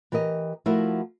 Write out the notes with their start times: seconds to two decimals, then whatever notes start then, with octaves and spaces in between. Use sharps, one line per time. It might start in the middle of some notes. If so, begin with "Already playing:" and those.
0.12 E3 G4 A#4 D#5
0.66 F3 A3 E4 F#4 A#4